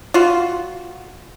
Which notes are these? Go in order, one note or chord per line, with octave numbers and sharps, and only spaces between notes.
F4 F#4